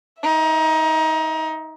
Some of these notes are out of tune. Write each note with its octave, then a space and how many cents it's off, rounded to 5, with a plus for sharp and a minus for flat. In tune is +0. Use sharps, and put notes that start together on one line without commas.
D#4 +25 E5 -5